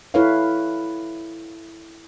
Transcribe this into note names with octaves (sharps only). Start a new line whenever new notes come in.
E4 A4 B4 C#5 F5